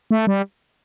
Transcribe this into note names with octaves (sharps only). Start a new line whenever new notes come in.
A3
G3